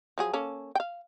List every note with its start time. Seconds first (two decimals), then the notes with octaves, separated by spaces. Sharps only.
0.18 F3 F#3 G#4
0.33 A#3 C#4 A4
0.75 F5 G5